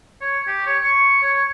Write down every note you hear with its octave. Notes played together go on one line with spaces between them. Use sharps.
C#5
G4
C#5
C#6
C#5